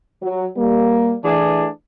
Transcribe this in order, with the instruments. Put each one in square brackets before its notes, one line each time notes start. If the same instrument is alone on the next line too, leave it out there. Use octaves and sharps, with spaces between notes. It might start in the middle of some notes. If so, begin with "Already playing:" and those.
[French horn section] F#3
G3 A#3
[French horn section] E3 [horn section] A3 D4 G#4